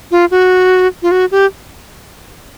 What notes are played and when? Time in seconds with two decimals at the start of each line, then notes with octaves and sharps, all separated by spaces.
0.11 F4
0.31 F#4
1.02 F4
1.11 F#4
1.31 G4